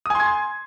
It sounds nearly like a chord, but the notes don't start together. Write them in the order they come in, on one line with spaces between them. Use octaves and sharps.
D#6 G#5 C6 G#6